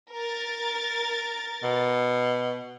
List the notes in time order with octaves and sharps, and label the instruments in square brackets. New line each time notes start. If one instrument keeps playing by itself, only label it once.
[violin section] A#4 A6
[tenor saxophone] B2